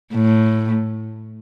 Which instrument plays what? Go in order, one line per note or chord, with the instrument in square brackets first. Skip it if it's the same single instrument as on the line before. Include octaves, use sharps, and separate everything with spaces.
[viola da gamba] A2